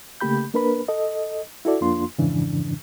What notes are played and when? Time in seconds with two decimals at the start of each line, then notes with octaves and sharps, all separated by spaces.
0.21 C#3 A3 A#3 G4 B5 G6
0.54 A#3 D4 A#4 B4 B5
0.88 A4 D#5
1.65 E4 F#4 A4 D5
1.81 F2 A#3 D4 F4 C6
2.18 F2 G#2 C#3 E3 D4